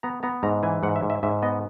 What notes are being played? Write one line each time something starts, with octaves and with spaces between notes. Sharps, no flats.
B3 A#5
B3 A#5
G#2 A#5
E3 G#5
G#2 F#5
E5
G#2
E5
G#2 E5
B3 D#5